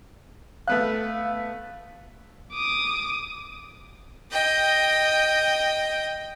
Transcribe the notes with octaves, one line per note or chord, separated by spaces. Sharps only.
A3 B3 F5 F#6
D6 D#6
D#5 G5